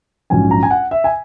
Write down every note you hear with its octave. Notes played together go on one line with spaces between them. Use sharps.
A#1 G#2 F#3 C#4 G#5
A#5
G#5
F#5
E5
G#5